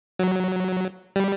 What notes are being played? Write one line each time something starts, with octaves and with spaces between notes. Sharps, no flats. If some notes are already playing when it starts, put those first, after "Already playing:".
F#3
G3